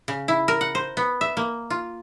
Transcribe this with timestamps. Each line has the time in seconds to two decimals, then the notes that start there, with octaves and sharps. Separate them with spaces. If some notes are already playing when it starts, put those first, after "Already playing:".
0.08 C#3
0.28 E4
0.48 A#4
0.61 F#5
0.75 C5
0.97 B3
1.21 E5
1.37 A#3
1.70 F4